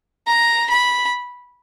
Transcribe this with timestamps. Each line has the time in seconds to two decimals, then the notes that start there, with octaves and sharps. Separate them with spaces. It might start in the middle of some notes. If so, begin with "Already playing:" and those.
0.27 A#5
0.70 B5